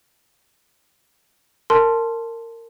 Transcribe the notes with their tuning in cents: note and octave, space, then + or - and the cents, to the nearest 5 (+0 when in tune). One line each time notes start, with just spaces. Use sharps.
A#4 -25 A5 -5 C6 +0